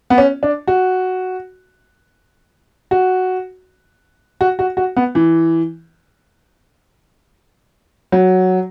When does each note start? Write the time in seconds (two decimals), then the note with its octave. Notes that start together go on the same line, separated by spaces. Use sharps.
0.10 B3
0.18 C#4
0.43 D4
0.68 F#4
2.91 F#4
4.41 F#4
4.59 F#4
4.77 F#4
4.97 B3
5.15 E3
8.12 F#3